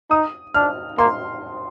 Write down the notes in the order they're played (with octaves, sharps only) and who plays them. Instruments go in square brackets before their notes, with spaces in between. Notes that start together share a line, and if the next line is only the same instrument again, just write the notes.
[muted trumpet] D#4 [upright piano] D#6
[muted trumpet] D4 [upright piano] F6
[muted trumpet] A#3 [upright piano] C6